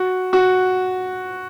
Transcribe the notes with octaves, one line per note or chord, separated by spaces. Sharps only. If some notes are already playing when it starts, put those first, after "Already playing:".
Already playing: F#4
F#4